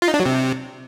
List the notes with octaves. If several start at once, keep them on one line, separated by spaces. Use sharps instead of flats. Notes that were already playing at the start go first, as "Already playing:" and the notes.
F4
D#4
D4
F#3
C3